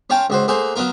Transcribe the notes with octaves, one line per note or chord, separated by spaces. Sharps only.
C#4 F4 C#5 G5 A5
C#2 F#4 C5
A3 A#3 G#4 C5 F#5
F#3 B3 F4 A#4